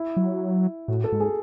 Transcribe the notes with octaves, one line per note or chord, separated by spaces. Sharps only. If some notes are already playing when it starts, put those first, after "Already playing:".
Already playing: E4
F#3
A2 F#4
A4
G#2
G#4